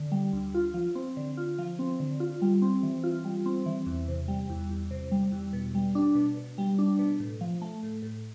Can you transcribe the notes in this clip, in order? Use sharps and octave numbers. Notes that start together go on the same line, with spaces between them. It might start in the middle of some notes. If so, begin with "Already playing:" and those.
Already playing: D3
G3
D2
F4
F3
C4
D3
F4
F3
C4
D3
F4
G3
C4
E3
F4
G3
C4
E3
E2
C3
G3
E2
E2
C3
G3
E2
B2
G3
D4
B2
B2
G3
D4
B2
A2
F3
A3
A2
A2